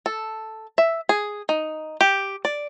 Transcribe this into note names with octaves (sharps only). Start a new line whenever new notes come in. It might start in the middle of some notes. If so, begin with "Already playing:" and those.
A4
E5
G#4
D#4
G4
D5